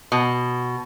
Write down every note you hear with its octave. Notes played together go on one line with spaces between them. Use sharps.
B2